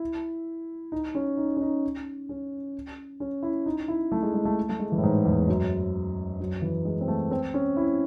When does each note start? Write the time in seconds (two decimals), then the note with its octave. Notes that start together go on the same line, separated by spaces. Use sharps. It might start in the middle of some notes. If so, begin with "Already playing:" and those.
Already playing: E4
0.92 D#4
1.15 C#4
1.37 D#4
1.57 C#4
1.61 D#4
2.29 C#4
3.20 C#4
3.43 E4
3.66 D#4
3.88 E4
4.12 A3
4.23 G#3
4.34 G#3
4.45 A3
4.69 A3
4.79 G#3
4.92 E3
4.98 A2
5.03 G#2
5.25 E2
5.38 E2
5.48 F#2
6.40 F#2
6.62 E3
6.85 G#3
7.01 C4
7.08 A3
7.31 C4
7.54 C#4
7.77 E4